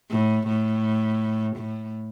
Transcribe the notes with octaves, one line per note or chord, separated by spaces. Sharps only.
A2
A2
A2